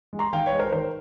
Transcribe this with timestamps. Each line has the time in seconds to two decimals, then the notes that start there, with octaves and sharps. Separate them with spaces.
0.13 G#3
0.19 A#5 C6
0.33 D#3 F5 G5
0.46 B4 C#5
0.53 G#3
0.59 A#4 C5
0.72 D#3 A#4 C5